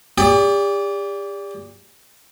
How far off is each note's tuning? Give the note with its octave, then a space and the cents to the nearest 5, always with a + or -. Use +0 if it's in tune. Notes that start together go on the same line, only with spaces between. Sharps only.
G4 +40 D5 -25